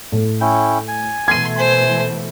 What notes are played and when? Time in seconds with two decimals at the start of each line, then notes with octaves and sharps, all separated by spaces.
0.12 A2
0.41 C#4 E4 G5
0.88 G#5
1.28 B2 E3 A3 C6 G#6 D#7
1.58 C5 G#5 C6